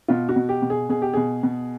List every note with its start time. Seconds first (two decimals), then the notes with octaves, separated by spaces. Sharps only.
0.08 B2 F4
0.29 F#4
0.36 B2
0.49 G4
0.62 B2
0.70 G#4
0.89 B2 G#4
1.02 G4
1.13 B2 G#4
1.43 B2